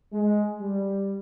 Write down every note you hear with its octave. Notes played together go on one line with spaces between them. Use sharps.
G#3
G3